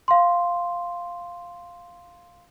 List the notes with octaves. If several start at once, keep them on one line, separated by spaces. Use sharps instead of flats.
F5 C6